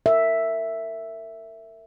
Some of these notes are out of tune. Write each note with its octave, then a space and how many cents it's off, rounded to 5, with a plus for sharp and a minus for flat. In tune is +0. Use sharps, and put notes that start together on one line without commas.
A#4 -35 E5 +0